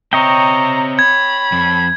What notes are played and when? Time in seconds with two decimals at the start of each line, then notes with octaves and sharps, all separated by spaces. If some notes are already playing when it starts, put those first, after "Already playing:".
0.13 C4 C#5 D#5 E5 G5 A#5
0.99 B5 G#6
1.52 F2